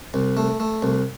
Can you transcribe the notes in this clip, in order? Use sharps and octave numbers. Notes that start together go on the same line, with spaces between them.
C2
A3
A3
C2